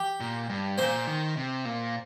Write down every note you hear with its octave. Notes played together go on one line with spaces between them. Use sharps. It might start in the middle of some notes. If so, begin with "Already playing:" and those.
Already playing: G4
A#2
G2
A#2 C5
D#3
C3
A#2